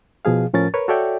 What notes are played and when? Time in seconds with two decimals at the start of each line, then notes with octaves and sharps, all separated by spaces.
0.25 B2 F3 G#4 F5
0.53 A2 F3 C#4 A#4 A6
0.74 A#4 B4 C#5
0.88 F#4 A4 C#5 D5 E5 G5